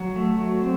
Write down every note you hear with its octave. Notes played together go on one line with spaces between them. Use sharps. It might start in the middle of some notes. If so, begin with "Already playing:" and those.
Already playing: F#3 F#4
A3
F#3
C4